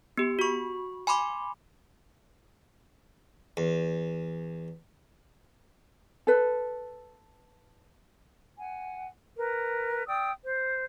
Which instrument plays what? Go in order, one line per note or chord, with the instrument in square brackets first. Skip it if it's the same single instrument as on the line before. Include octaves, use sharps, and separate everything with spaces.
[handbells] B3 G4
F#4 C#6
G#5 B5 C6 D6
[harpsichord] E2
[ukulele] A4 B4
[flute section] F#5 G#5
A#4 B4
D5 G5 D#6 E6
C5